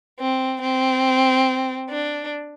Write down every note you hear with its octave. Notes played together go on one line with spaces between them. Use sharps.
C4
C4
D4